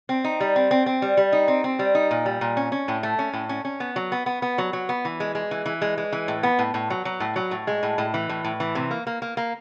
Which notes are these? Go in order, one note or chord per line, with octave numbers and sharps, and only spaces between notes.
C4
D#4
G3
C4
C4
C4
G3
G3
D#4
C4
C4
G3
D#4
A#2
G3
A#2
C#4
C#4
A2
A3
C#4
A2
C#4
C#4
B3
F#3
B3
B3
B3
F#3
F#3
B3
E3
G#3
G#3
E3
E3
G#3
G#3
E3
A2
B3
A2
A2
F#3
F#3
A2
F#3
A2
G#3
A2
A2
E3
A2
A2
E3
C3
A#3
A#3
A#3
A#3